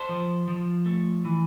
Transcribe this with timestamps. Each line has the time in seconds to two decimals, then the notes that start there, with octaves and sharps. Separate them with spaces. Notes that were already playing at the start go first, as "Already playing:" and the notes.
Already playing: A4 C5
0.09 F3
0.48 F3
0.86 A3
1.25 E3